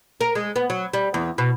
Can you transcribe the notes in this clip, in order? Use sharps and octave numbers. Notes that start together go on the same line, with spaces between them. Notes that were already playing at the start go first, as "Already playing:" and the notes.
A#4
G#3
B3
F#3
G3
E2
B2